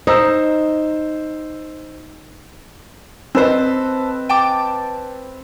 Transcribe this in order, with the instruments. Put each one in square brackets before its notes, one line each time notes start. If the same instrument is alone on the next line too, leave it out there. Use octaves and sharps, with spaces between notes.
[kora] D#4 [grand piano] C5 E6
[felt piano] C4 B4 D#5 [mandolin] A4 C5
[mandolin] G5 A5 D6